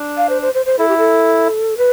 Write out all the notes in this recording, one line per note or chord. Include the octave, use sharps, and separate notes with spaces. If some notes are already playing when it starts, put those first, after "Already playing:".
Already playing: D4
F5
C5
C5
C5
C5
E4 A4
G4
A4
B4